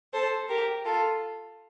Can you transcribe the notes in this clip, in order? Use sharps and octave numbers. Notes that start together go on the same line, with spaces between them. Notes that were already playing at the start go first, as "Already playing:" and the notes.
A4 C5
G4 A#4
F4 A4